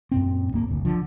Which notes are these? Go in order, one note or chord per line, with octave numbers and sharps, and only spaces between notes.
F#2 A#2 C4
D1 G1 A#3
F#1 D2
D3 F3